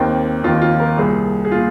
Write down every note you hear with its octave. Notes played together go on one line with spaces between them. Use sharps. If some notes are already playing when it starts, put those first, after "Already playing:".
Already playing: D#2 D#3 C4
D#2 D#3 F4
F4
A#4
C2 A#2 G#4
G#4
A#2 F4